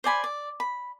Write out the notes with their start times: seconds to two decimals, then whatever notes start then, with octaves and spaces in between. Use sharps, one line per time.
0.04 C5 D5 G#5 B5
0.24 D5
0.60 B5